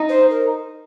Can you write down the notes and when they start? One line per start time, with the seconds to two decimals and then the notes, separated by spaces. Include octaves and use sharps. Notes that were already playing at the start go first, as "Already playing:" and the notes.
Already playing: D#4
0.09 C5
0.30 A#4